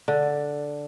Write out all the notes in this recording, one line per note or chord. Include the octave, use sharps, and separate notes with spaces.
D3